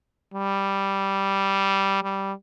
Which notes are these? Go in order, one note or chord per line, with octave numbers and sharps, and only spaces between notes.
G3
G3